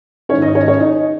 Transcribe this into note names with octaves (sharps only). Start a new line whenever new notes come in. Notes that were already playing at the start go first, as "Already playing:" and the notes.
G#2 D#3 C#4 C#5
D#4 D#5
C#4 C#5
C#4 C#5
D#4 D#5